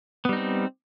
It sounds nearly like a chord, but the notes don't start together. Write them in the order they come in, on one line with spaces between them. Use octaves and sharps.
B3 G3 D#4 C4